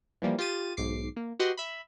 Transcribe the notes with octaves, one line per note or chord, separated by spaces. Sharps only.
E3 F3 G3 A#3
F4 G4 A6 D#7
B1 G#2 D6 C7
A#3
F#4 G4 B4 D#5 F#5 C6
E5 B5